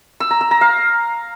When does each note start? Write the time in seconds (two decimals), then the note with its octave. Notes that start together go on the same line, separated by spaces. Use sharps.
0.20 E6
0.31 A#5
0.41 E6
0.51 A#5
0.61 F5